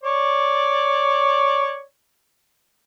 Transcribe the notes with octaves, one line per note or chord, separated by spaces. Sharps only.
C#5 D5